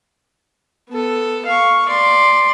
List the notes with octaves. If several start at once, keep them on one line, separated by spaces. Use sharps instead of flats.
B3 A4
F5 C#6
D5 C6